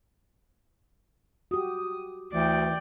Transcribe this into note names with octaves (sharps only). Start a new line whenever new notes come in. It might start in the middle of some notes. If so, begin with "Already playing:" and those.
F#4 G4 D#6
D2 E3 D5 G5